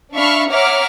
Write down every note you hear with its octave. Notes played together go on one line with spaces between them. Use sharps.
D4 E5 F5 B5 C#6 F6
C#5 E5 F#5 A#5 D6 F6